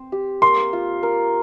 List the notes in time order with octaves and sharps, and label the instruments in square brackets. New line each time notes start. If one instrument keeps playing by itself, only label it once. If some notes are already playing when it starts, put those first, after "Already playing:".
Already playing: [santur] C4 C5
G4
[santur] A#3 [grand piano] C6
[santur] F4
A#4